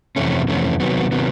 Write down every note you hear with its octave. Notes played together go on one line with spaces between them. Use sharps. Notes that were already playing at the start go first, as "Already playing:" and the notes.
F2 C3 E3 A3 C#4
F2 C3 E3 A3 C#4
C3 D#3 F#3 B3
C3 D#3 F#3 B3